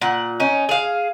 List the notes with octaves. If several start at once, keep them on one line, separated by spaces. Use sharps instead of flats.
A#2 F#5
C#4 D#4
G#4 F5